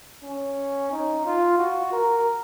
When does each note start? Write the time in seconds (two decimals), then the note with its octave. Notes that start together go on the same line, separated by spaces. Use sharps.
0.24 C#4
0.92 D#4
1.26 F4
1.59 F#4
1.92 A#4